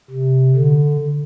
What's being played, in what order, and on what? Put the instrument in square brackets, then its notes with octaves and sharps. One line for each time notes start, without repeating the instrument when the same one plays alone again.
[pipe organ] C3
D3